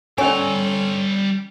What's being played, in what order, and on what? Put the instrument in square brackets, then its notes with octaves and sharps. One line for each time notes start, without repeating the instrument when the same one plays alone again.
[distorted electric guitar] G3 A#5 [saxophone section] C4 A4 [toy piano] C#4 G#5 [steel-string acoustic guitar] C#5